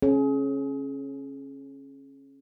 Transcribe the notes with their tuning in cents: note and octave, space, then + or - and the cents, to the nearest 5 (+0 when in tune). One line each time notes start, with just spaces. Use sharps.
C#4 -20 G#4 +30